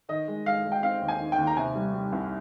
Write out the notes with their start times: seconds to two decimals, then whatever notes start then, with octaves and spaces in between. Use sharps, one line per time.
0.09 D#3 D#5
0.28 G#3
0.46 G#3 F5
0.65 G#3
0.72 G5
0.83 C4 F5
1.01 D#2
1.08 G#5
1.20 D#3
1.32 G5
1.38 D#2
1.47 A#5
1.57 C3 G#5
1.75 G3
1.94 G3
2.12 C2